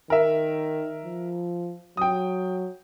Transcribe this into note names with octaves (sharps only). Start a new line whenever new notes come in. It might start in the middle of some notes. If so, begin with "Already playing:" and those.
D#3 A#4 E5
F3
F#3 G5 D#6